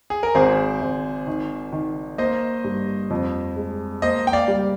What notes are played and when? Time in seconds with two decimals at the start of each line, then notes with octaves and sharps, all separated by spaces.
0.10 G#4
0.23 A#4
0.35 G#1 G#4 C5
0.82 G#1
1.27 D#3
1.72 D#3
2.18 A#3 C5 D#5
2.64 G2
3.10 F2
3.56 G#3
4.02 A#3 C5 D#5
4.27 G5
4.33 D5 F5
4.48 G3